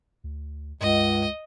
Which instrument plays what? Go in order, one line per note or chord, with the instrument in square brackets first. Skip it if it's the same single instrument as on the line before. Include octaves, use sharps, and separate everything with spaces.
[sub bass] D2
[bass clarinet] C#2 [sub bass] G2 [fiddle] D#5